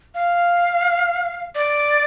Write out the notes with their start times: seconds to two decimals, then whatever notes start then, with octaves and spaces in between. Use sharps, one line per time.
0.15 F5
1.55 D5